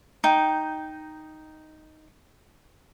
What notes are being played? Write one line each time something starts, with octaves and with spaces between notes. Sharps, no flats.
D#4 G5